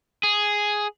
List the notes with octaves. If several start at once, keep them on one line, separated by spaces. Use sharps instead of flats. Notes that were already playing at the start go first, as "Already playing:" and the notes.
G#4